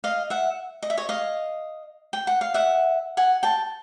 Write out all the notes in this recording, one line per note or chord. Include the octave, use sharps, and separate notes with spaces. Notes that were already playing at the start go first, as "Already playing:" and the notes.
D#5 F5
E5 F#5
D#5
E5
C#5 D#5
D#5 F5
G5
F#5
F5
E5 F#5
F#5 G#5
G5 A5